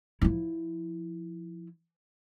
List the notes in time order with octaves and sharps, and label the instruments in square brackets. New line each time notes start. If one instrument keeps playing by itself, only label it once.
[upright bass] F3 E4